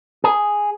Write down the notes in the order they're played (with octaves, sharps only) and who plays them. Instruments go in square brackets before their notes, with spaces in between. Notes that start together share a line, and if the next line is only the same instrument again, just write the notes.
[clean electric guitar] G#4